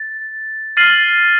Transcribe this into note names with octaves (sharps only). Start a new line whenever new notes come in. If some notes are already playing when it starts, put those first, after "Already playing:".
Already playing: A6
F6 A6 C7 D#7 F#7